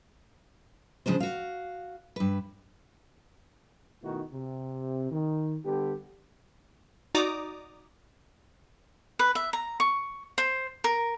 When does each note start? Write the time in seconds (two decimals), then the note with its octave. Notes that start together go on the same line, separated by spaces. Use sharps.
1.06 C#3 F3 G#3 D4 C5
1.20 F#4 F5
2.16 G2 B4
4.03 B2 D#3 A3 D#4 E4 F#4
4.32 C3
5.11 D#3
5.64 D3 G3 B3 G4
7.15 D#4 F#4 D5 A#5 D6 D#6
9.19 B4
9.35 E5
9.53 A#5
9.80 C#6
10.38 C5
10.84 A#4